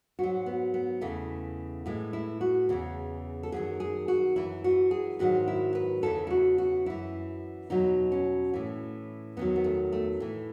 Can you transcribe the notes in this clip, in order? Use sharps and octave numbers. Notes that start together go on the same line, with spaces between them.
G#2 F#3 F#4
B3
B3
E2 C#3 E3 A3
A2 E3 G#3
E4
F#4
E2 C#3 E3
A4
F#2 D#3 F#3 G#4
G#4
F#4
F#2 E3 E4
F#4
G#4
G#2 D#3 F#3 F#4
E4
B4
E2 C#3 E3 A4
E4
F#4
F#4
F#2 E3 E4
E2 B2 F#3 D#4
C#4
A2 E3
E2 D#3 F#3 B3
B3
A3
A3
A2 E3